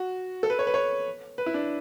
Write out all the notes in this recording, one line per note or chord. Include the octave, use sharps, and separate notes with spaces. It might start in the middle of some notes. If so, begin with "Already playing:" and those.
Already playing: F#4
A4
B4
C#5
B4
C#5
B4
E4
D4